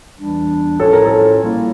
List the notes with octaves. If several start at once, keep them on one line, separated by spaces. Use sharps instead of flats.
E2 E3 G3 D4
A2 F3 C#4 F4 A4 C#5
A#4
A4
A#2 G3 A#3 E4